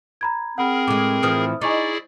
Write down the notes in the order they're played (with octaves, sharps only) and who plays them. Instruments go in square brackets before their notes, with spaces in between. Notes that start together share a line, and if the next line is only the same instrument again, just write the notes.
[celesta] A#5 B5 G#6
[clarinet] C4 [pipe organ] G#4 A#4 [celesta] F#5 B5 F6
[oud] A2 G#3 [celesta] D6
[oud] A2 E3 F3 [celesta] D#6 F6
[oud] D#4 [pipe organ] E4 G#4 D5 [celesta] G#5 C#6 D6